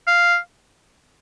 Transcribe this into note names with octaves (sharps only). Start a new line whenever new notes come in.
F5